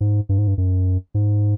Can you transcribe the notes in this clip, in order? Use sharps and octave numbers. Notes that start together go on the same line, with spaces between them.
G#2
G2
G#2
G2
F#2
G#2